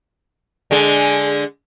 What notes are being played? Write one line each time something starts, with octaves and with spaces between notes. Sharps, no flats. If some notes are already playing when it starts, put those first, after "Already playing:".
D3 G#3